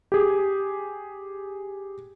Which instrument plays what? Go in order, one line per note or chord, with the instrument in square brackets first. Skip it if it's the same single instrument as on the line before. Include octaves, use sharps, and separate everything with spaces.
[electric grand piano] G4 G#4